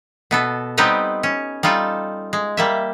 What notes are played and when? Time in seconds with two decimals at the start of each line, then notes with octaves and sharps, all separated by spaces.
0.31 B2 B3 A4
0.77 G3 B3 C4 D#4 G4 B4
1.23 C#4
1.63 G3 D#4 F4 A4
2.33 G#3
2.57 G3 A#3 E5